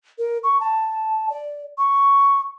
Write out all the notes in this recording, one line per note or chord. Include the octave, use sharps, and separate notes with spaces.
A#4
C#6
A5
D5
C#6